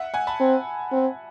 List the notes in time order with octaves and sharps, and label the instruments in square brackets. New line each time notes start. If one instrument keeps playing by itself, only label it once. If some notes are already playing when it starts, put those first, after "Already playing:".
Already playing: [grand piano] E5 F#5
F#5 G#5
A5 B5
[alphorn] C4
C4